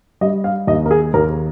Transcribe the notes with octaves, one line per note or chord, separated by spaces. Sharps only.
G3 D#5
F5
D#2 D#5
A#4
G#4
D#2 A#4